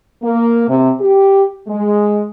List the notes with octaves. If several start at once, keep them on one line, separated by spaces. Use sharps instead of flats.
A#3
C3
G4
G#3